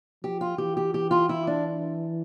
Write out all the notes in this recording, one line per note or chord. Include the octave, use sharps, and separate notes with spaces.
F3 G4
F4
E3 G4
G4
E3 G4
F4
E4
D4